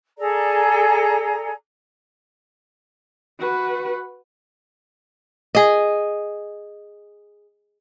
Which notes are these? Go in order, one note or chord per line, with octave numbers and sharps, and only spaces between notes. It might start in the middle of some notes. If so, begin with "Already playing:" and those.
G#4 A4 D5 A#5
F#4 B4
G#4 D#5